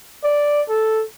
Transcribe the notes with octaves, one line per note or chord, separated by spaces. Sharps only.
D5
A4